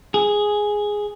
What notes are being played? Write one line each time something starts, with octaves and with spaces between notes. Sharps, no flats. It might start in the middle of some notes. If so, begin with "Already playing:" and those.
G#4